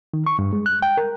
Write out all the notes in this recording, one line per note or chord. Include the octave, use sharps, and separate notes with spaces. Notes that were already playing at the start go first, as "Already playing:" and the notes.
D#3
C#6
G2
G#3
F#6
G5
A#4